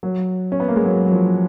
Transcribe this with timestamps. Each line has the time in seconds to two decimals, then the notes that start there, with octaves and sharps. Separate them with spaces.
0.03 F#3
0.52 C#4
0.60 B3
0.68 A#3
0.76 G#3
0.85 F#3
1.06 F#3
1.11 F3